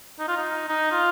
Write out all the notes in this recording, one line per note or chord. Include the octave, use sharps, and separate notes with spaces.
D#4
F4
D#4
D#4
F4